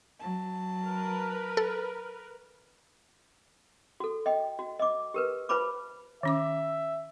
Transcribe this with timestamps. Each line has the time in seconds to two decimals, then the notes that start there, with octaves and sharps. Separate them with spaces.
0.20 F#3 A5
0.84 A#4 B4
1.57 A4
4.00 F#4 A4
4.26 D#5 G5
4.59 F#4
4.79 D#5 D6
5.14 G4 A#4 B4
5.49 F4 B4 C5 A5 B5 D6
6.23 D#3 C#4 E5 D6